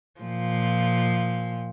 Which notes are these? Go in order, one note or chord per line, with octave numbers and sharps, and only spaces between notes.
A#2 F3